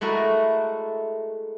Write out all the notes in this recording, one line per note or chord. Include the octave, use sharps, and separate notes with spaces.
G#3 A3 E4 F#4 A#4